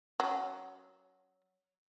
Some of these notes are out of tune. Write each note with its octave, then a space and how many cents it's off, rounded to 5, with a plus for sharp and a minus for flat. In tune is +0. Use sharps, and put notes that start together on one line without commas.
F#3 +10 C#4 +0